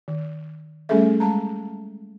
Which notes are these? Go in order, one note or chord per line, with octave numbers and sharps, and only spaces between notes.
D#3
G3 A3 C#4 G#4 A4 E5
G#3 A5 A#5